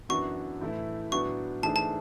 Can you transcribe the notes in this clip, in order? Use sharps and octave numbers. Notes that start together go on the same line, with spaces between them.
F#2 E3 B3 D4 F#4 C#6
A2 E3 A3 E4
A2 F#3 B3 D4 F#4 C#6
G#2 E3 A3 D4 G#4 A5
A5